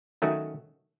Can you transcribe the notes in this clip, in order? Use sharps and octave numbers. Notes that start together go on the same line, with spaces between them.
D#3 F#3 A3 C#4 F#4